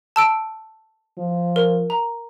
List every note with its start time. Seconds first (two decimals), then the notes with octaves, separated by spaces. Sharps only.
0.16 A5 E6 D7
1.18 F3
1.56 A#4
1.90 A#5